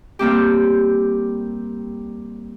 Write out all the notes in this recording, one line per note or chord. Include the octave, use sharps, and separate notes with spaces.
G3 A#3 C4 G4